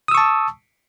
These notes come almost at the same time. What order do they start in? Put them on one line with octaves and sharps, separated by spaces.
D#6 E6 C#6 A5